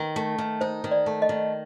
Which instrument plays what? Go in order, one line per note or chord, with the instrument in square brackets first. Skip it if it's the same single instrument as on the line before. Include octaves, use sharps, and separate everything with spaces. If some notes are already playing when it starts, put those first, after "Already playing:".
Already playing: [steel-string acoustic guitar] D#3 [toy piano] A#4
[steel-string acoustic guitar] A3
D#3
[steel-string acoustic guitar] D#4 [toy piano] C5
[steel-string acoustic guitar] D#3
[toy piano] D5
[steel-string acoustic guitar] A3
[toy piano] D#5
[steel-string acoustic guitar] D#3